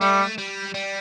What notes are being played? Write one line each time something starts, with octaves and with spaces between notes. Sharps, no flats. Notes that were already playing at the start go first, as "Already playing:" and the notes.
G3 A3
G3
G3